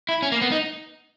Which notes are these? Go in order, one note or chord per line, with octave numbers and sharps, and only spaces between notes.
E4
C#4
A#3
B3
D#4